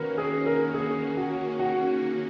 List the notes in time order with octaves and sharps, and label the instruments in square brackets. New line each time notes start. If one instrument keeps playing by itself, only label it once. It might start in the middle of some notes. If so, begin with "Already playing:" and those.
Already playing: [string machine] D#3 A#3 C#4 F#4 [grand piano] A#4 B4
[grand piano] G#4
A#4
G#4
F#4
F#4